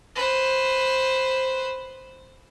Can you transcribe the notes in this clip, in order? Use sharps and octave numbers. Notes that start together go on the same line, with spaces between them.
B4 C5